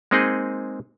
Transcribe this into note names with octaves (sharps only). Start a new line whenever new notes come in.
G#3 A#3 C4 D#4 G#4 D#5